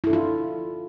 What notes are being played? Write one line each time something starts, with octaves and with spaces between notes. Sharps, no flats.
D4 E4 F4 A4